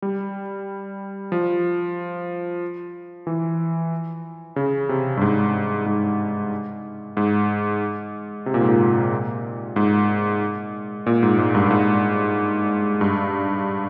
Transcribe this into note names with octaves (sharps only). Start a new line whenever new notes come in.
G3
F3
E3
C#3
C3
G2
G#2
G#2
G#2
C3
A#2
G#2
A#2
G#2
A#2
G#2
G#2
G2
G#2
G2